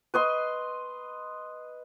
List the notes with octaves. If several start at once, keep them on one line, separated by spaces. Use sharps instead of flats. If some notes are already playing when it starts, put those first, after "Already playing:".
B4 D#5 C6